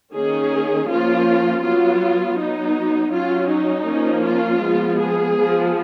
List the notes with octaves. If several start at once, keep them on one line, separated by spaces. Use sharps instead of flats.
D#3 A#3 C#4 G#4
F3 A#3 C#4 F4
F#3 B3 F4
F#3 B3 D#4
F#3 C#4 F4
D#4
F3 A#3 C#4
F4
F3 G#3 B3
G#4
F3 B3